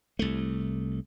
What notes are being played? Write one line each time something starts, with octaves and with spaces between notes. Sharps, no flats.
C2 A3